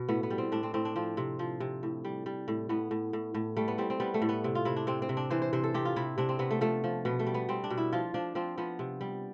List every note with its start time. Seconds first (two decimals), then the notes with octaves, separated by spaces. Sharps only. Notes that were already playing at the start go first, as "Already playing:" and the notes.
Already playing: B2
0.09 A2 B3
0.23 B3
0.30 G3
0.38 C4
0.52 A2 D4
0.63 C4
0.74 A2 C4
0.85 D4
0.96 F3 C4
1.17 C3
1.39 F3
1.60 C3
1.83 A2
2.05 G3
2.26 G3
2.48 A2
2.69 A2 B3
2.91 A2
3.13 A2
3.34 A2
3.57 G3 A3
3.68 B3
3.78 G3 C4
3.90 C4
4.00 G3 B3
4.14 A3
4.22 A2
4.29 B3
4.44 C3
4.55 F4
4.65 C3 E4
4.76 D4
4.87 C3 C4
5.02 C4
5.09 C3
5.17 D4
5.30 E3 C5
5.42 C5
5.53 C3 C5
5.64 A4
5.74 C3 G4
5.85 F4
5.96 C3 E4
6.18 C3 D4
6.29 C4
6.39 C3 B3
6.51 A3
6.61 F3 A3
6.84 F3
7.05 B2 B3
7.19 A3
7.26 G3
7.34 B3
7.49 G3 C4
7.64 D4
7.70 B2
7.78 E4
7.92 F3 F4
8.14 F3 D4
8.35 F3 C4
8.58 F3 B3
8.79 C3
9.01 G3